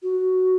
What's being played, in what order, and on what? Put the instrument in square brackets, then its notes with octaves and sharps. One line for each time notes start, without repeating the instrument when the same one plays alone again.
[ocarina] F#4